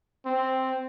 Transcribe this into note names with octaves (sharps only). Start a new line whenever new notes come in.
C4